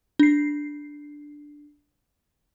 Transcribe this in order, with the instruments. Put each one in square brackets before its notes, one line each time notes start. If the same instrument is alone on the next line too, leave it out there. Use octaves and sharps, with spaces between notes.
[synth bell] D4 C7